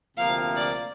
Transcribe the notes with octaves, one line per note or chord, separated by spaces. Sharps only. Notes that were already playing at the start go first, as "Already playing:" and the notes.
D2 C3 F3 A#3 F5
D5